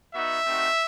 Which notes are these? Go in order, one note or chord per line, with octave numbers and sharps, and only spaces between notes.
B3 D#4 F#4 E5
A3 C4 D#4 F#4